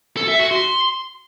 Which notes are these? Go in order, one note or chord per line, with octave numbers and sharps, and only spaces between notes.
A4
E5
F#4
C6